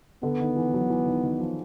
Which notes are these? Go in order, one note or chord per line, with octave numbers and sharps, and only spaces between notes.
D3 B3
D#3
E3
F#3
E3
D#3
D#3
F3